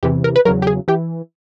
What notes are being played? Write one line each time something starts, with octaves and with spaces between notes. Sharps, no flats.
E2 C3 E3 G4
A#4
B4
E2 C#3 F#3 A#4
G4
G#4
E3 G4